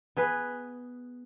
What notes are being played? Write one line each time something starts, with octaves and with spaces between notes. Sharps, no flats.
B3 G#4 B4